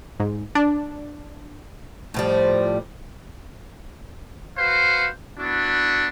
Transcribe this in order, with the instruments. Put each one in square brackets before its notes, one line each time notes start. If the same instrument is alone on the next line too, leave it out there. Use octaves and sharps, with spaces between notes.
[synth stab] G#2
D4
[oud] A2 F3 G3
[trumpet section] F#4 B4 C5 F5
B3 D4 E4 F#4